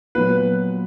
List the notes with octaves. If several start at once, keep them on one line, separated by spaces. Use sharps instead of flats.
A#2 F#3 B3 F4 B4